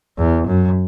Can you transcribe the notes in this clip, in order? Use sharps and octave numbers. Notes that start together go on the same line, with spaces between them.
E2
F#2